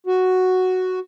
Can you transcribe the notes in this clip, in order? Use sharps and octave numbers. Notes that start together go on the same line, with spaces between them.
F#4